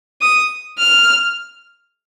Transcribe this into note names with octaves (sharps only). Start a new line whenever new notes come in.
D#6
F6